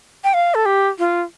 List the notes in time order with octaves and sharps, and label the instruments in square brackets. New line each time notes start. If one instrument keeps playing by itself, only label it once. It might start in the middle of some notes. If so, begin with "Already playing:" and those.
[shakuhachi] G5
F5
A4
G4
F4